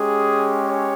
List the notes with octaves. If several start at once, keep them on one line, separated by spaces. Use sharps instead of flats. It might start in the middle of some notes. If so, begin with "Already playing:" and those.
Already playing: G#3 C#4 G4 G#4
C#5